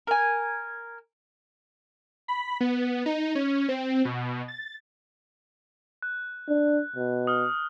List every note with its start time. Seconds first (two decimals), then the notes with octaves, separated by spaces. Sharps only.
0.07 A#4 G#5
2.28 B5
2.60 B3
3.06 D#4
3.35 C#4
3.69 C4
4.05 B2
4.48 A6
6.02 F#6
6.49 D4
6.96 B2
7.27 D#6 F6